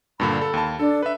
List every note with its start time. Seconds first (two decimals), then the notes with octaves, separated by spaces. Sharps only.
0.20 G2 A#2 D3 B5
0.41 A4
0.54 D#2 A5
0.80 D4 A4
1.03 B4 E5